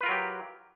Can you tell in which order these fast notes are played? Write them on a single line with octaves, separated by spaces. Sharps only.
B4 F4 A#4 F#3 G4